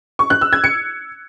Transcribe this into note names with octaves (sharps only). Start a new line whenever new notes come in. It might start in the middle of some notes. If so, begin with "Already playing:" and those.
C#6
F#6
E6
G#6
C#7